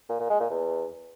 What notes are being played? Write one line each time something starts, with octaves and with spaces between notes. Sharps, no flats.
A#2
A#2
G#3
A#2
E2